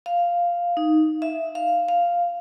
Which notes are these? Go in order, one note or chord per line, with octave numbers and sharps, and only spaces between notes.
F5
D#4
E5
F5
F5